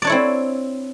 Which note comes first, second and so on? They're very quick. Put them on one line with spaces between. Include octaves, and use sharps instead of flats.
D5 D4 C#5 E4 C4